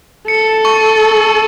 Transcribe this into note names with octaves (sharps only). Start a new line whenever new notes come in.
A4 C#7
C#6
E6